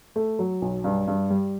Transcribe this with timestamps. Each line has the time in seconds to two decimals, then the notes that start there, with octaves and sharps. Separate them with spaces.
0.16 A3
0.39 F#3
0.62 B1
0.84 G2
1.08 G2
1.30 G3